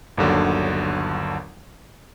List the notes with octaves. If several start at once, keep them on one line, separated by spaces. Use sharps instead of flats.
G1 D#2 D3 F#3